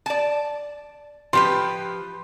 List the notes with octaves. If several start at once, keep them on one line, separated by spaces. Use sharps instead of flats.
D5 A5
F3 G4 B4 C6